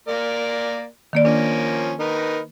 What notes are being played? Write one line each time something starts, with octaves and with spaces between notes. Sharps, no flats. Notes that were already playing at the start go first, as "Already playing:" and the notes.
A#3 A#4 D5
D#3 A#3 D5
F3 A#3 C#4 D4
D#4 A#4 B4